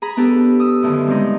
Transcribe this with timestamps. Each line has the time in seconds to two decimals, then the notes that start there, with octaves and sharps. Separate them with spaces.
0.02 G#4 A#5 B5
0.17 B3 D4 G4 A4
0.60 D#6 E6
0.82 F#2 A2 D3 D#3
1.07 G3 G#3 C4 D#4